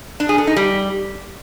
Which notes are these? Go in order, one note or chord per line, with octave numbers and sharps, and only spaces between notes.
D4
G#4
A4
D#4
G3